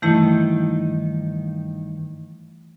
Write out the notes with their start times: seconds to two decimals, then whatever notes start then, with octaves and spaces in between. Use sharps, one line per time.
0.02 G2 D#3 E3 A3 D#4 E4